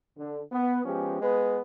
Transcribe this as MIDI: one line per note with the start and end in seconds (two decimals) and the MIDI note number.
0.17 0.41 50
0.52 0.80 59
0.85 1.21 53
0.85 1.21 56
0.85 1.21 59
0.85 1.21 61
0.85 1.21 67
1.22 1.60 56
1.22 1.60 59
1.22 1.60 71